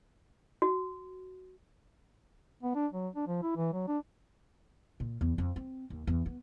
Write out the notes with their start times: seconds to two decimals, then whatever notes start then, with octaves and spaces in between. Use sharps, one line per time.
0.62 F#4
2.63 B3
2.75 D4
2.92 F#3
3.15 D4
3.27 F3
3.43 E4
3.56 E3
3.73 F#3
3.88 D4
5.00 A#2
5.21 E2
5.38 F2
5.56 C4
5.90 D#2
6.07 E2
6.26 B3